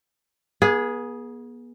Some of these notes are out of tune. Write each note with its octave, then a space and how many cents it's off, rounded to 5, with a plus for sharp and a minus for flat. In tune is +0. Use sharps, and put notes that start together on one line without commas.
B3 -40 G#4 +0